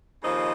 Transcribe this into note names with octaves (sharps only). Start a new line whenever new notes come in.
D#2 C#3 F3 C4 D#4 D#5